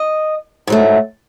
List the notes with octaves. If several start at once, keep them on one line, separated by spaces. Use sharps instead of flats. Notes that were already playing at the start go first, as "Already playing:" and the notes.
Already playing: D#5
G#2 F#3 A3